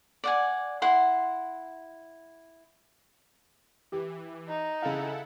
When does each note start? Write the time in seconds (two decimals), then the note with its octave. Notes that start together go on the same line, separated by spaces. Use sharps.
0.24 D5 F#5 G#5
0.82 E4 F#5 C6
3.92 E3 G4
4.49 D#4
4.82 C#3 E4 A4 F5 F#5